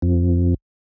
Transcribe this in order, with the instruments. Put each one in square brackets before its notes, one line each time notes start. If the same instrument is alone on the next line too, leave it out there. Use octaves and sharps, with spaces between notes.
[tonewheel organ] F2